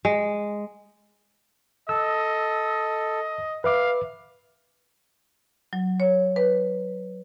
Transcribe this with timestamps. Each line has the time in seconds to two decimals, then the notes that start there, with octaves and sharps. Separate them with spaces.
0.05 G#3
1.89 A4 D#5 E6
3.64 B4 E5 F5 D6
5.73 F#3
6.00 C#5
6.36 B4